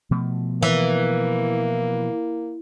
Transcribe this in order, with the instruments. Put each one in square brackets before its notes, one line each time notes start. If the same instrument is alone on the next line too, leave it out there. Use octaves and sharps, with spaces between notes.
[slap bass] B2 F3 A3
[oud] E3 [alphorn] A#3